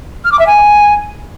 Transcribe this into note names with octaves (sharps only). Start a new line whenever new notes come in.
F6
D6
E5
G#5